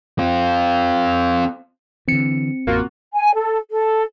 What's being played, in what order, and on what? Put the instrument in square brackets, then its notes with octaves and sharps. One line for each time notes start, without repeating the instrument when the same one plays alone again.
[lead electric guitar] C4 F4
[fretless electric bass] D3 E3 [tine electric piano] C4 C#7
[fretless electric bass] A1 F2 [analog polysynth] A#3 F4 F#4
[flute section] G#5
A4
A4